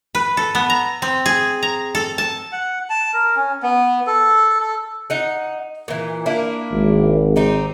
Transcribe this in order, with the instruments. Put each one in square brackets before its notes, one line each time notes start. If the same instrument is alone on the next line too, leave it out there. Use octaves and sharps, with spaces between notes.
[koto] B4
A4
B3
A#5
C4
G#4
A#5
A4
A5
[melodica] F#5
A5
A#4
C#4
B3
A4
A4
[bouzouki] D#4 F#5
A#2 E3
A#3 D4 E4
[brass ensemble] G#1
[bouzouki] C4 D#4 G4